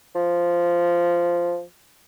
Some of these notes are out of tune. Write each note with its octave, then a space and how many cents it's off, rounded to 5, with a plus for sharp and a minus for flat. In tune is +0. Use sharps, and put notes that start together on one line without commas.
F3 -10